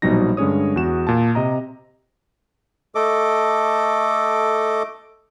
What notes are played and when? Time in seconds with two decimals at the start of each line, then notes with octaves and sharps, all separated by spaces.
0.02 A#1 B2 F#3 G3 D#4 A#6
0.37 G2 D3 G#3 C#4 C#5 D#6
0.76 E2 F#4 E7
1.07 A#2 A5
1.35 C3 D#5 A#5
2.95 A3 A4 D#5 D6